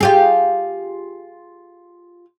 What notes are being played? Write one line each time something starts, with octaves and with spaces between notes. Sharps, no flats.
F4 G4 G#4